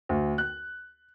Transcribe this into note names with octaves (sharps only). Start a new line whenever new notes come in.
D2
F#6